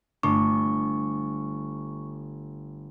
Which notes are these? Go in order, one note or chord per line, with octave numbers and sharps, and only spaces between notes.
G1 A3 D4 C#6